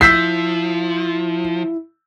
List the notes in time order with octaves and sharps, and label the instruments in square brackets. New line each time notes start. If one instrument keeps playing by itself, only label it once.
[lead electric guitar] F3 [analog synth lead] E4 [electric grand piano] E6 G6 C7 [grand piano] B6